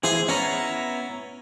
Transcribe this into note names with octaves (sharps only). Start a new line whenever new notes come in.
E3 E4 G#4 C5 G#5
B3 C#4 E4 A#5